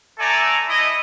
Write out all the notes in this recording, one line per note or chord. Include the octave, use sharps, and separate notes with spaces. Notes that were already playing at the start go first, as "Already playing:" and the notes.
A3 A4 D5 G#5 A#5
A3 E4 D#5